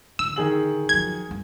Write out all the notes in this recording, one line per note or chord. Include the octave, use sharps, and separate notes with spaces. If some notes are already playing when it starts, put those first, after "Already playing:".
A1 D3 E6
D#3 G#4 F#7
F#2 F3 G#6
D2 G2